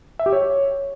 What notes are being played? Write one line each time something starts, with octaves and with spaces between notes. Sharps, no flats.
E5
G4
C#5